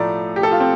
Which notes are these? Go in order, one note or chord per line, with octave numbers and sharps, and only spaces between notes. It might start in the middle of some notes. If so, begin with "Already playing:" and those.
Already playing: A2 F3 A3 D5 A#5
G4
A4
F4
C4